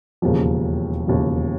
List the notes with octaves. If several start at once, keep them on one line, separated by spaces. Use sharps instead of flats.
E1 D#2 C#3 F3
E1 D#2 C#3 F3